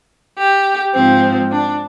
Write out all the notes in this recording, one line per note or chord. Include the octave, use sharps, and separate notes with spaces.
G4
G#2 F3 C4
D4